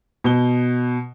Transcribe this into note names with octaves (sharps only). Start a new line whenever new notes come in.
B2 G7